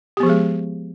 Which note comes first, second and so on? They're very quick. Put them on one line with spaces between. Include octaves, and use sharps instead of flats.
G4 B3 F3 G#4 G#3